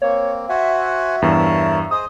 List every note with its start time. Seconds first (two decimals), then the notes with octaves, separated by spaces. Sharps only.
0.02 A#3 C4 C#5
0.49 F#4 C5 E5 F#5 G#5
1.22 E2 G2 A#4 C#5 A5
1.91 G#4 C5 D#5 D#6